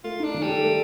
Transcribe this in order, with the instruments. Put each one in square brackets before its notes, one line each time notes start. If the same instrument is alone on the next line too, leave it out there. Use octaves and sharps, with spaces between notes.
[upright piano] A3 [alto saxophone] F4
[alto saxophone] D4 [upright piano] D#4
[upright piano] D#3
[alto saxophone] G3
[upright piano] A4
A3